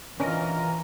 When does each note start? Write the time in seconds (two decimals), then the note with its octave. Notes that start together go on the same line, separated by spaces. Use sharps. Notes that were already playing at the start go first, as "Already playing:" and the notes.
0.20 E3 C#4 D4 F4 A#4 D#5